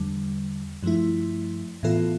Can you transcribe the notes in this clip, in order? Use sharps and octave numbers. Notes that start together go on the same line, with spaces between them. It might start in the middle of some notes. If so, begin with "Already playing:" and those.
Already playing: E2 D3 G3
G2 F3 A3 E4
A2 E3 B3 F4 A4